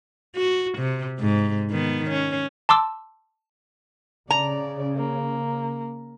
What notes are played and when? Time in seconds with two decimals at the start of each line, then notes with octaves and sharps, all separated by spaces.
0.36 F#4
0.79 C3
1.19 G#2
1.70 D#3 B3
2.10 C#4
2.69 A5 C6 D6 E6
4.31 C#3 D5 A#5
4.97 A#3